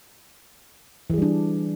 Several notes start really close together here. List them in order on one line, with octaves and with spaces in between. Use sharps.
E3 G#4 G3 D4